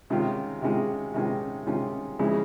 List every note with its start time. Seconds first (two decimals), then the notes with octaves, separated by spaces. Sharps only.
0.10 C3 D#3 G#3 C#4 F4
0.62 C3 D#3 G#3 C#4 F4
1.14 C3 D#3 G#3 C#4 F4
1.66 C3 D#3 G#3 C#4 F4
2.19 C#3 F3 G#3 C#4 E4